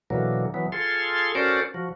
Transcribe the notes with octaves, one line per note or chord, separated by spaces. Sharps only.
B2 D3 E3 F#3 A#3
E3 F#3 B3
F4 G#4 A4 C6
C#4 F#4 A4 A#4 C5 D5
F3 F#4